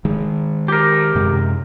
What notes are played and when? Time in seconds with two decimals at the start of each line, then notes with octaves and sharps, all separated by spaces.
0.05 D#3 G#3
0.68 G4 A#4
1.15 F#2 C3 G#3